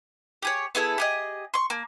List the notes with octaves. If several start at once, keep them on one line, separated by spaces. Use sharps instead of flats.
G4 G#4 C#5
B3 E4 G#4 A4
G4 G#4 D#5
C6 C#6
A#3